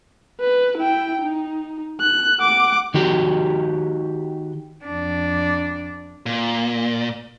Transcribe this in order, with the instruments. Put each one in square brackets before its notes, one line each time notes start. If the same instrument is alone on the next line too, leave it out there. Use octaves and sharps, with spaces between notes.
[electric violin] B4
E4 G5
D#4
F#6
F#5 D6
[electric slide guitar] D#3 F#4 G4
[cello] F2 D4
[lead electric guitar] A#2